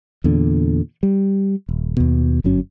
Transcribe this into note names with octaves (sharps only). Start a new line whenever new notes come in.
E2 A#2 D3
G3
D#1
D#2 B2
G1 F#2 F#3 C#4